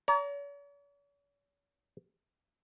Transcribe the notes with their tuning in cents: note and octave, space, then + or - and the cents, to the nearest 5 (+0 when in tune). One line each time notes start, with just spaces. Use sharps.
C#5 +45 A#5 +0